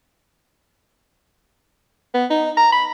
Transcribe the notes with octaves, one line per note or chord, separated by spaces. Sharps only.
B3
D#4
A#5
B5